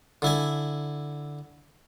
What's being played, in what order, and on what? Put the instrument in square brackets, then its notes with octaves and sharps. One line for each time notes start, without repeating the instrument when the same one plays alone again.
[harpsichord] D3 E4 G#5